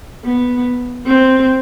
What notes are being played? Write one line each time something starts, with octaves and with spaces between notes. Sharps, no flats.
B3
C4